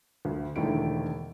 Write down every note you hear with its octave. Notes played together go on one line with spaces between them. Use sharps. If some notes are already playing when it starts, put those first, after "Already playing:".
D2
E1 D3 D#3 A3 E4 D7